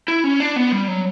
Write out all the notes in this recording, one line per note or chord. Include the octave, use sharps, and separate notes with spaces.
E4
C#4
D4
B3
G3
F#3